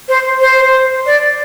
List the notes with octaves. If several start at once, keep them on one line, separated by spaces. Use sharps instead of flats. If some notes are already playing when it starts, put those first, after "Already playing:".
C5
C5
D5